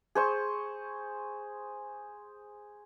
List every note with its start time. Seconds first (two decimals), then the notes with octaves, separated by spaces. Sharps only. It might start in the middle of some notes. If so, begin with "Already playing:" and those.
0.15 G#4 C5 C#6